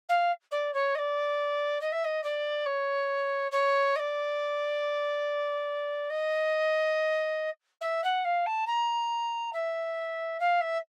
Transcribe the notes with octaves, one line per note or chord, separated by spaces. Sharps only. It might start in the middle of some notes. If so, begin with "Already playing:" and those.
F5
D5
C#5
D#5
D5
D#5
E5
D#5
D5
C#5
C#5
D#5
D5
D#5
E5
F#5
F5
A5
A#5
E5
F5
E5